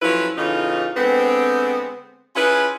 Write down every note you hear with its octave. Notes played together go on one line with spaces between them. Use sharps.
F3 F#3 A3 C#4 E4 B4
A2 C#3 E3 A3 D#4 F4
D3 G#3 B3 C4
C#4 E4 F4 G#4 B4